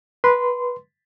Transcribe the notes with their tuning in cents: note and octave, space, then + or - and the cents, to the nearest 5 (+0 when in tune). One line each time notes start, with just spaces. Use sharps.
B4 -15 C6 -20